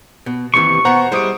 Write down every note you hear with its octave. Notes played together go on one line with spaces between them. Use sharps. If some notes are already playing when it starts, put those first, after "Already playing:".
B2
D#2 C3 E3 C#6
B2 B3 C5 F#5 A#5
G3 G#3 E4 C5 D#6 D7